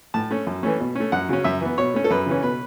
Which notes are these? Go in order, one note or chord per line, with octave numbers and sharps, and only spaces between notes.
A2 A5
A3 C#4
F#2
E3 A3 C#4
B2
A3 C#4
F#2 F#5
C#3 F#3 C#4
F#2 E5
E3 B3
B2 C#5
A3 C#4
A4
F#2 B4
C#3 E3 C#4
B2 B4